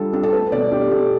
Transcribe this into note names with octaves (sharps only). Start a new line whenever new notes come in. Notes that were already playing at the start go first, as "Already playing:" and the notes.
Already playing: G3 D4 F4 A4
D4 A4
A4
A3 B4
B2 D5
D4 G4
B2 A4